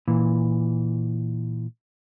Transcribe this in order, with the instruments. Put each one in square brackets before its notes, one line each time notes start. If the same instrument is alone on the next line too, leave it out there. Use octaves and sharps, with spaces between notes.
[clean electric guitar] A#2 E3